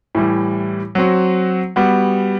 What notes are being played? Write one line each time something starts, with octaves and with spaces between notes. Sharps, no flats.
A2 E3 G3
F#3 C4 F#4
G3 B3 F#4